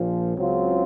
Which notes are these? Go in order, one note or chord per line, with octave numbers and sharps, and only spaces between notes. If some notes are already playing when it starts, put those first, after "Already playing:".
Already playing: A#1 A#2 F3
C#2 C#3 F#3 C4 F4